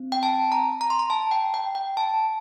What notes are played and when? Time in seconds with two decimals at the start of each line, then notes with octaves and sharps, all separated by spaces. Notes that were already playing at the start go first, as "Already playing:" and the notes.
Already playing: C4
0.12 G5
0.23 A5
0.52 A#5
0.81 A#5
0.90 C6
0.99 A#5
1.10 A5
1.31 G5
1.54 G5
1.75 G5
1.97 A5